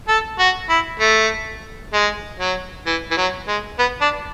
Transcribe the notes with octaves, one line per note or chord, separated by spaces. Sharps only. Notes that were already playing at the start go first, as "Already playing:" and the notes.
A4
F#4
E4
A3
G#3
F#3
E3
E3
F#3
G#3
B3
D4